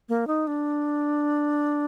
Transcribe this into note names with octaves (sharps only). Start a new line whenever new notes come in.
A#3
D#4
D4